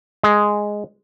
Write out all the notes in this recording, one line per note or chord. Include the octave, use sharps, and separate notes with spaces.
G#3